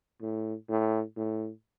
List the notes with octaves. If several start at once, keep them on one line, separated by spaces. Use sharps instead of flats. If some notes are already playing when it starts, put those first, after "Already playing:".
A2
A2
A2